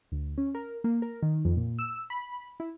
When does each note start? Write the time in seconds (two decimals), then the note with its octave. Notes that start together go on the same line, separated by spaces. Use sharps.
0.12 D2
0.38 C#4
0.55 A#4
0.84 A#3
1.02 A#4
1.22 D#3
1.45 F2
1.57 A#2
1.79 E6
2.10 B5
2.60 E4